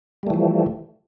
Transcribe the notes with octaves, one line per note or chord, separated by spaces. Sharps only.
E3 F3 G3 A3